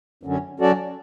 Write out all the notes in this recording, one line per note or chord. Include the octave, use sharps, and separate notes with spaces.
F#2 D3 F#3 C#4
F#3 C#4 F#4 A4 D5